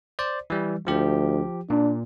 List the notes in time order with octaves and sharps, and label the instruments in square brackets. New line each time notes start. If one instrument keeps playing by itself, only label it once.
[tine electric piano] C5 D5
E3 G3
[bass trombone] D2 [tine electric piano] F3 G4
[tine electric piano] A#2 [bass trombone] D4